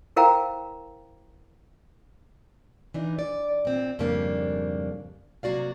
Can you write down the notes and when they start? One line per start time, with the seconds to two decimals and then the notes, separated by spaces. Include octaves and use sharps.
0.16 E4 A#4 C5 F5 G5 A#5
2.94 E3 D4 D#4
3.19 D5
3.65 A#2 C4
3.99 F2 G#2 C#3 G3 A#3 D4
5.43 C3 F#3 A#3 F#4 D5 F5